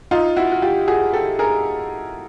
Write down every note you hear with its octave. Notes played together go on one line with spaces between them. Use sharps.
D#4 F4
E4 F#4
F#4
F4 G4
F#4 G#4
G4 A4
G#4 A#4